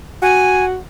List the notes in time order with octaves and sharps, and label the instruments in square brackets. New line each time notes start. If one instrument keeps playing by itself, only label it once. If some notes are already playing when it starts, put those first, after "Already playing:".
[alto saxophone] F#4 [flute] G#5